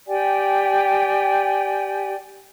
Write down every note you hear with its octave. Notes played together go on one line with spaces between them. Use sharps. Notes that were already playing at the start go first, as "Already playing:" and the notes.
G4 D5 G5 G#5